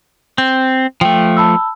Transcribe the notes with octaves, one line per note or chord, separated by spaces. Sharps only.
C4
F3 A3 G5
A5 B5 E6